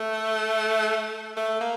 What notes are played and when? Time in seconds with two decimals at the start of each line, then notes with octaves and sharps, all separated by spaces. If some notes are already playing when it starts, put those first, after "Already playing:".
Already playing: A3
1.37 A3
1.61 A#3